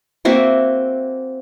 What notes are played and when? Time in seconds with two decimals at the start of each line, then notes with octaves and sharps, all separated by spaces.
0.25 A#3 C4 F#4 E5